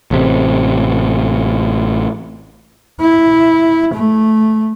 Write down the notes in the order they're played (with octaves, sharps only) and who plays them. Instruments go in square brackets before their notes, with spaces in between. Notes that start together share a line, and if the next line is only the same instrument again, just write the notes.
[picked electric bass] A1 C3
[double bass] E4
A3